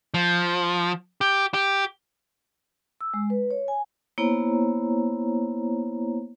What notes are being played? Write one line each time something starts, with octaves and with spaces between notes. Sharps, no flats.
F3
G4
G4
E6
G#3
B4
C#5
G#5
A#3 B3 E4 C5 C#5 A#5